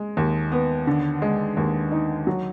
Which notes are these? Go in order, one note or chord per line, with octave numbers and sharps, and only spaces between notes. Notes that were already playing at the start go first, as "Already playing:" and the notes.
Already playing: G#3
D#2
B3
D3
G#3
D#2
D#4
F#3